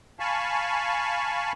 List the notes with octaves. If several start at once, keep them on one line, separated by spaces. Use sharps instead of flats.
F5 G#5 A5 B5 C#6